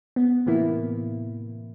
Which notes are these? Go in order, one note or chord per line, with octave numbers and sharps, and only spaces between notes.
B3
A2 C3 E3 A#3 B3 E4